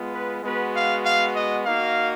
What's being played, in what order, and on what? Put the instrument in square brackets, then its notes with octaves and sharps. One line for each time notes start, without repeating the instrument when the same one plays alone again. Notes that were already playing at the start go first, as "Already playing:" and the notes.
Already playing: [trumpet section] G#3 B3 F4
B4
G#3 B3 F#4 B4
F5
F5
D#5
A#3 D#4 F#4 F5